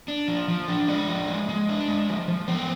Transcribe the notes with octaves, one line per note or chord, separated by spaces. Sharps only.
D4
F3
F3
D4
G#3 D5
F3
G#3
G#3
D4
G#3
F3
F3
B3 C5